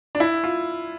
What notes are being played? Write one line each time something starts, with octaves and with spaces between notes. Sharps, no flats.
D4
E4
F4